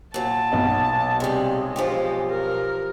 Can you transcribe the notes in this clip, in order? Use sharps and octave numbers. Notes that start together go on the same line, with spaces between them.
A#2 F#3 A5
B1 B3 D#5
C3 G3 G#3
F3 F4 G4
A#4